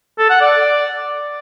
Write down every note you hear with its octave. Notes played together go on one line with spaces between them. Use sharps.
A4
F#5
D5